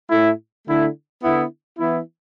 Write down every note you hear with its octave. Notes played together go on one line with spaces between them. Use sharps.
A2 A3 E4
D3 A3 E4
D3 B3 E4
E3 B3 E4